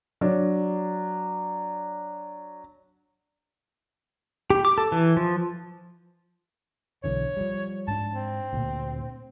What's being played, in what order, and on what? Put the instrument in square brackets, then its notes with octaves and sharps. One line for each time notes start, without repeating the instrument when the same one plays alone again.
[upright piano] F#3 D4
[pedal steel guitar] G4
D6
A4
E3
F3
[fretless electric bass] B1 D3 E3 [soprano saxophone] C#5
[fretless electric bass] F3 G3
[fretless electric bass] G#2 D4 [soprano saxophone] A5
[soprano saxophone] C4
[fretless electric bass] D2 A#2